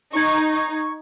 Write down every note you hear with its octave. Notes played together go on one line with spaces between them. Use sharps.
D#4 C#6 G#6